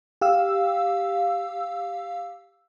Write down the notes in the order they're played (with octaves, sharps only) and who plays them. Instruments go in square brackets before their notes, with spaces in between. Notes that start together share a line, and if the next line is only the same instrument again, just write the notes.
[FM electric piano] G4 F5 E6